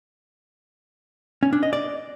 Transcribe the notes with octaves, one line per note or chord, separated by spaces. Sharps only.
C#4
D4
D#5
D5